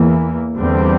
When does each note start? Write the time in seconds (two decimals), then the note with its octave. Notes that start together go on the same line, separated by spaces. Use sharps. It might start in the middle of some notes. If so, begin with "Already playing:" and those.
Already playing: E2 E3 A#3
0.56 E2 D3 G3 C4